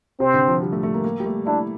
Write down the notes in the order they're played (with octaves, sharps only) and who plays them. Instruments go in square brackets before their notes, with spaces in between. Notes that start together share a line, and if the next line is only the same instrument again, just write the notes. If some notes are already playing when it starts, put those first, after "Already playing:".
[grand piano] C3 [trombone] C4
[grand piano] D3
F3
G3
A3
A3
A#3
A#3
G3
A3
[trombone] D4 [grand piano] E4